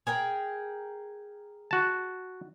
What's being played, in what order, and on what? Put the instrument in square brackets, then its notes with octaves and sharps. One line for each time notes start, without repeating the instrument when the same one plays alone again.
[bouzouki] G#4 A#4 G5
[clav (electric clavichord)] F#4 A5